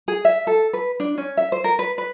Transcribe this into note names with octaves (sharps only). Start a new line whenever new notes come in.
G#4
E5
A4
B4
D4
C#4
E5
C5
A#4
B4
B4